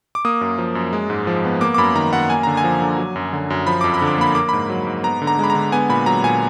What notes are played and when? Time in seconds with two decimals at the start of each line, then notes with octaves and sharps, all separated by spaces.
0.15 D6
0.25 A#3 D#6
0.41 F#2
0.58 F3
0.75 F#2
0.93 G#3
1.10 G#2
1.27 F3
1.45 B3
1.61 A#3 D6
1.74 D6
1.78 F#2 B5
1.95 D#3 A#5
2.12 F#2 F#5
2.30 A#3 G#5
2.43 D3 A#5
2.57 G#5
2.64 F3
2.82 D3
2.98 F#3
3.16 F#2
3.33 D3
3.50 F#2
3.67 F3 B5
3.81 F2 D6
3.94 B5
4.02 D3
4.07 D6
4.18 A#3 B5
4.35 A#3 D6
4.49 G#2 B5
4.70 F#3
4.87 G#2
5.03 B3 A#5
5.22 D3
5.27 A#5
5.39 G#3 B5
5.50 A#5
5.55 D3
5.72 B3 G#5
5.89 A#2 B5
6.06 F#3 A#5
6.24 A#2 G#5